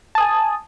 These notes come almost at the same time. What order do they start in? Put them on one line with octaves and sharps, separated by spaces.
A5 D#6 G#5